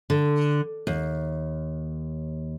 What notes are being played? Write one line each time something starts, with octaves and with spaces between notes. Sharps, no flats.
D3
D#2